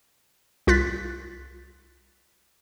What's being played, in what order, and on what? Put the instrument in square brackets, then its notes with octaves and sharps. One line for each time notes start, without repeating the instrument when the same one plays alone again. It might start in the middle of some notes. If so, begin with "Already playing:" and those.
[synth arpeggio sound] C2 F4 F#6 A6 B6